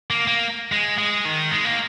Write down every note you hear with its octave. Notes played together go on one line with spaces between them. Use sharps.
A#3
A#3
G#3
G#3
D#3
G#3
A#3